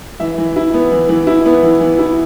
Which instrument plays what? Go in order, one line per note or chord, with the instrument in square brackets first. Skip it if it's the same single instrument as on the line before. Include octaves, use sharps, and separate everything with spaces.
[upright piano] E3 E5
E3
E4
B3
E3
E3
E4
B3
E3
E3
E4